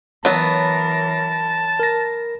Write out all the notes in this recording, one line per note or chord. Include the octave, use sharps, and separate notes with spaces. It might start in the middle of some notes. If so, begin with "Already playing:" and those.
E3 F#3 B3 A#4 C#5 A5
A#4 A#6